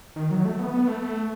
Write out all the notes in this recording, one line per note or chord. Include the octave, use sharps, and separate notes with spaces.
D#3
F#3
A3
B3
B3
A3
A3